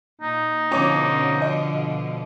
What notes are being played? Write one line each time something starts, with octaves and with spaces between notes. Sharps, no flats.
A#2 D#4
B2 D3 F3 C#4 C#5 D6
D#5